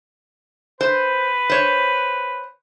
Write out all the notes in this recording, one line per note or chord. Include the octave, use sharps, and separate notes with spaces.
B4 C5
C5 C#5